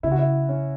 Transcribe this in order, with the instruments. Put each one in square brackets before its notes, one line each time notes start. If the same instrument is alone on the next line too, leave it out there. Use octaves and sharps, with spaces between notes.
[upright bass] C#3 [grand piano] E4
[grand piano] F#4
E4
C#4